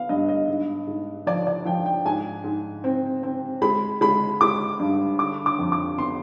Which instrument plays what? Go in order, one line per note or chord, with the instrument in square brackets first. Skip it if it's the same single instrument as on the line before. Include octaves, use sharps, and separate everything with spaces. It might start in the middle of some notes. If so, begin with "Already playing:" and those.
Already playing: [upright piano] B3 F5
G2 D#5
D#5
G#2
G#2
F3 D5
D5
F3 G5
G5
G#2 G#5
G#2
C4
C4
G#3 B5
G#3 B5
G#3 D6
G2
D3 D6
D6
F2
D6
B3 C6